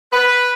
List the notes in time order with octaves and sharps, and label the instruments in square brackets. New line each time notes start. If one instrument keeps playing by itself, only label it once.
[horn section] B4